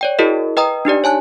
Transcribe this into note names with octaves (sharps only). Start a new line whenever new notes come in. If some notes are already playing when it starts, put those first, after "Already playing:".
C#5 D5 G5
E4 F#4 G#4 A#4 D#5
B4 D#5 G5 A#5 D#6
D4 D#4 G4 D5
C#5 G#5 A5 F#6